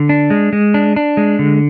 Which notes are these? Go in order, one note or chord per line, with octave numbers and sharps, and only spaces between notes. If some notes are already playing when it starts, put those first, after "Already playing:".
Already playing: D3
D4
G#3
G#3
D4
D4
G#3
D3